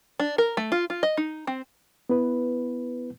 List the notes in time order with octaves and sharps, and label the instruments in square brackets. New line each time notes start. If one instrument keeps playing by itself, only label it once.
[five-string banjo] D4
A#4
A3
F4
F4
D#5
D#4
C4
[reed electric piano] B3 E4 B4